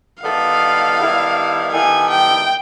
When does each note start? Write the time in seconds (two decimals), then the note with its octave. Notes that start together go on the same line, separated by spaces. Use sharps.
0.23 D#3 G3 B3 E4 A4 F5
0.98 D#3 G3 B3 E4 A4
1.72 D#3 G3 B3 E4 A4 G#5
2.10 G5